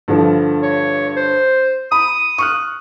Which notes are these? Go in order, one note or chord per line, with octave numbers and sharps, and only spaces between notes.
G2 D3 F3
C#5
C5
B5 D#6
C#6 F6 F#6